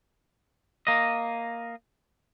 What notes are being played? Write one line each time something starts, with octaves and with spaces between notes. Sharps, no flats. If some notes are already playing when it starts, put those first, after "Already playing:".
A#3 D#5